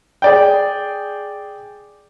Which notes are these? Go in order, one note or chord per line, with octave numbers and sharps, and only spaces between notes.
G#4 D5 G5